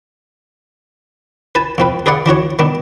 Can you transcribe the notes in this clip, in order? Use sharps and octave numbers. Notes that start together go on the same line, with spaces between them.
B4 G#5 A5
F2 C4 B4
G#4 B4 D5 F5 F#5
E3 D4 F#4 C#5
D#3 B3 D4